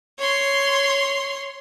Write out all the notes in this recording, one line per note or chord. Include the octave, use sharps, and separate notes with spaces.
C#5 C6